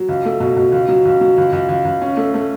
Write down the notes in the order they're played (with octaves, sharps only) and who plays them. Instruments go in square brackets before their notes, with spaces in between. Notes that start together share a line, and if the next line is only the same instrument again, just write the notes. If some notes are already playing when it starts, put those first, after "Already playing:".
Already playing: [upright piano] F#3
C#2
A3
B2
B2
C#2
F#3
C#2
F#3
C#2
C#2
C#2
C#2
C#4
A3
A3